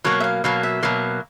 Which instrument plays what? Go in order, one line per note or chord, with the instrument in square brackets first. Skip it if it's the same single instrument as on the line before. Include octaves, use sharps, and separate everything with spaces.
[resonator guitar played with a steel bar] B2 F#3 A#3 [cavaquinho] C#5
[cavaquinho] E5
F5
[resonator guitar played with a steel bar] B2 F#3 A#3 [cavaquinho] F5
[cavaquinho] E5
[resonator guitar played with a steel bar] B2 F#3 A#3